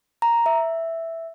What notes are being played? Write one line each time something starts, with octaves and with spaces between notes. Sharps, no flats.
A#5
E5